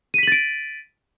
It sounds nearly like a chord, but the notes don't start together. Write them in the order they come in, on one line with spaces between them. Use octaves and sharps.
D#7 B6 F#7 A6 D7